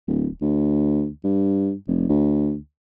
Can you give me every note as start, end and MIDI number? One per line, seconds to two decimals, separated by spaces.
0.07 0.28 26
0.41 1.08 38
1.24 1.73 43
1.87 2.06 29
2.09 2.56 38